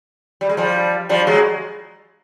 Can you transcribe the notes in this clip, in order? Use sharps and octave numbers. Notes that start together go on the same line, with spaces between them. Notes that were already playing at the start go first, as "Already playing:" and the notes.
G3
G#3
F3 G3
F3 G3
F#3 G#3